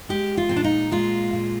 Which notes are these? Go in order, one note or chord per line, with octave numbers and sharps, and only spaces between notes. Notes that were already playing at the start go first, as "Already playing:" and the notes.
G#3 G4
F4
A#2 C4
D4
D#4
G#3 F4
A#2